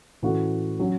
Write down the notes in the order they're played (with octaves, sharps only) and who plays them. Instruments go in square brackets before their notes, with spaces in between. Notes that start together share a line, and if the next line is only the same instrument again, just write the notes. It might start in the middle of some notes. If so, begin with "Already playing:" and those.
[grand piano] A2 E3 A3 C#4 F#4
F#3 C#4 F#4